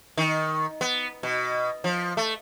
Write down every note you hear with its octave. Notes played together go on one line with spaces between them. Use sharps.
D#3
B3
B2
F3
A3